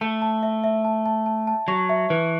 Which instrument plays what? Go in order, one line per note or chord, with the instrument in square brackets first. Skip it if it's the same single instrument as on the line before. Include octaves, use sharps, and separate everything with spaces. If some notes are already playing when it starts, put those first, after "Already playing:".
[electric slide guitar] A3 [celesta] A5
[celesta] A5
E5
E5
A5
A5
A5
A5
[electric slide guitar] F#3 [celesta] C#6
[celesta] E5
[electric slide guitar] E3 [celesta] B4